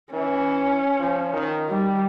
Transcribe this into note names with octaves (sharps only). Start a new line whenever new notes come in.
E3 C#4
F3
D#3
D#3 G3